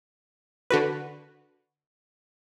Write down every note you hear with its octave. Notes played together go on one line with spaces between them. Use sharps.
D3 F#4 B4